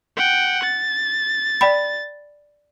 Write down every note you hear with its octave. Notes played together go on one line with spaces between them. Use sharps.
F#5 G5
A6
D5 G5 B5